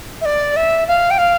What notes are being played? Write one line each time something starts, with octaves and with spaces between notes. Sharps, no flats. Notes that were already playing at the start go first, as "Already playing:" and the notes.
E5
D5
E5
F5
G5
F5